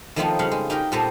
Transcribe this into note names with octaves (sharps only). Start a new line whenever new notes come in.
D#3 F3 A3 B3 C4 D#4
C#3 G3 F5 F#5
G#3
D#4 G4 A#4 G5
A#2 G3 B3 A4 C5 A#5